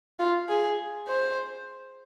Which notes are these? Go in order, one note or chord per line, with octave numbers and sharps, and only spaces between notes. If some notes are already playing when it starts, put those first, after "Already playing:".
F4
G#4
C5